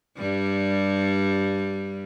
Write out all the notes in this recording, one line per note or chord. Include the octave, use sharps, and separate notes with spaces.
G2 G3